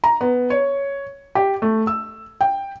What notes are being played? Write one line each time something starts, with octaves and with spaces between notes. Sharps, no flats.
A#5
B3
C#5
G4
A3
E6
G5